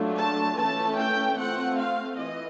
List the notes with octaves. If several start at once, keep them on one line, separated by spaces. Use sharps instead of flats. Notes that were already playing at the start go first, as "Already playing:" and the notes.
Already playing: F#3 A3 D4 F4
A5
E3 A3 C#4 A5
G5
A3 C4 F4 F#5
F5
E3 D#5